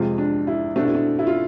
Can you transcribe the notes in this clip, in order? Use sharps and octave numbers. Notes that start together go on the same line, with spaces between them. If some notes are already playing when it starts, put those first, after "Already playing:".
Already playing: F2 C3 G#3 C4 F4
D4
E4
B2 A3 C4 D4
E4
D4
E4
F4